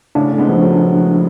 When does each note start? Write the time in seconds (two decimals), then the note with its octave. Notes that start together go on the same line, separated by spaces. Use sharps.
0.15 A2 C#3 D4
0.32 A3
0.38 G#3 B3
0.49 F3
0.61 F#3 A3